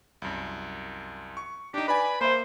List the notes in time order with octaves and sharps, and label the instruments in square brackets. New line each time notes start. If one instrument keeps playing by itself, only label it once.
[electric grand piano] C2 F#2
C#6
[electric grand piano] D4 D#4 [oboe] G4
[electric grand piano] B4 D5 G#5 [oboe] B5
[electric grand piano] A#3 E5 [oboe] C5